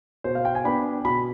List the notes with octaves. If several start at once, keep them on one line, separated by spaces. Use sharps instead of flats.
B2 C5
F5
G5
G#5
B3 D4 B5
B2 B5